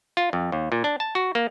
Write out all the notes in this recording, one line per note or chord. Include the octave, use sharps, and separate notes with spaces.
F4
F2
D#2
A#2
D4
A5
F#4
A#3